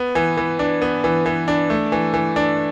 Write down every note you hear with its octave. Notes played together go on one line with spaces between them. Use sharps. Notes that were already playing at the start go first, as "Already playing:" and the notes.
Already playing: B3
E3
E3
D4
B3
E3
E3
D4
A3
E3
E3
D4